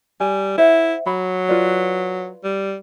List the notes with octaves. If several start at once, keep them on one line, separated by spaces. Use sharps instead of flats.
G3 G#5
E4 C5 E5 F#5
F#3 B5
F4 B4 D5
G3